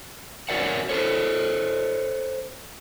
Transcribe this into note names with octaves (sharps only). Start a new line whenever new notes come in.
F#4 A#4 C#5 D5 E5 F#5
A4 C5 C#5